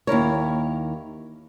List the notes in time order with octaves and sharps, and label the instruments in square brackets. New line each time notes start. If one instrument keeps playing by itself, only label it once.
[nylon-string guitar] D#2 E4 A#4 C#5